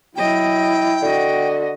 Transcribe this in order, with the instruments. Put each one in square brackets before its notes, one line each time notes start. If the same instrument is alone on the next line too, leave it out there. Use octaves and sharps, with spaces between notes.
[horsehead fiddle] F#3 D#5 [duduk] E4 [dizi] G5
[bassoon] D3 [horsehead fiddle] F#4 D#5